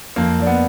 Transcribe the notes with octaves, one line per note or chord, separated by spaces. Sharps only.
F2 A#3
F3 D4
B3